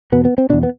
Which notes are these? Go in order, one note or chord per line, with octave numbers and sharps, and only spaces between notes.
E2 B2 B3
B3
C4
E2 B2 D4
B3